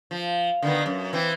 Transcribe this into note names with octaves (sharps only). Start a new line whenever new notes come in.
F3
D3 D#3 B3
F#2
E3 C4